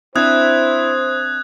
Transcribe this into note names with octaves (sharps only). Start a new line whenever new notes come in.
C4 D4 E4 C5 E5 D#6 F#6 G#6